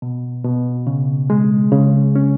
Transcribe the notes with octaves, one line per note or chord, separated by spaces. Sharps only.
B2
B2
C#3
G#3
C#3
C#4